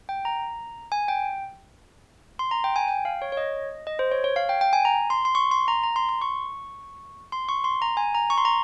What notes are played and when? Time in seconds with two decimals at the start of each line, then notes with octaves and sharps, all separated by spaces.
0.09 G5
0.25 A#5
0.92 G#5
1.08 G5
2.39 C6
2.51 A#5
2.64 G5
2.76 G#5
2.88 G5
3.05 F5
3.22 C#5
3.32 C#5
3.37 D#5
3.87 D#5
3.99 C5
4.11 C#5
4.24 C#5
4.36 F5
4.49 G5
4.61 G5
4.73 G#5
4.85 A#5
5.10 C6
5.25 C6
5.35 C#6
5.51 C6
5.68 A#5
5.83 A#5
5.96 C6
6.09 C6
6.21 C#6
7.32 C6
7.49 C#6
7.64 C6
7.82 A#5
7.97 G#5
8.15 A#5
8.30 C#6
8.38 C6
8.45 A#5